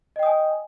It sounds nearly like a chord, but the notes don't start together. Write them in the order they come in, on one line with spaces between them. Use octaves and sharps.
D#5 G5 D#6 G#5